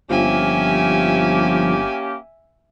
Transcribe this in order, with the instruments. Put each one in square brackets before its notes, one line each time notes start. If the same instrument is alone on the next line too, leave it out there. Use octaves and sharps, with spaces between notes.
[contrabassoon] G1 [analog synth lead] F3 [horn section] A#3 C#4 G4 [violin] E5 G#5